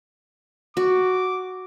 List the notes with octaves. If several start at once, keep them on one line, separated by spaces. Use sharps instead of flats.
F#4 D6